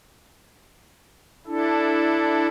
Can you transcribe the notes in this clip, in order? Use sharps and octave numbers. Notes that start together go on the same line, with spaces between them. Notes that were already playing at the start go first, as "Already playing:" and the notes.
D4 E4 A4